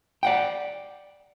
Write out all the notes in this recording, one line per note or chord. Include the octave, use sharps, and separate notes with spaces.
D5 F#5 G5